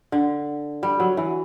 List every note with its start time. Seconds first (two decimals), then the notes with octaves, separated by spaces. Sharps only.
0.12 D3
0.83 G3
1.00 F#3
1.17 E3